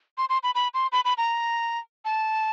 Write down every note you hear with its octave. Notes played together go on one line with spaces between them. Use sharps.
C6
C6
B5
B5
C6
B5
B5
A#5
A5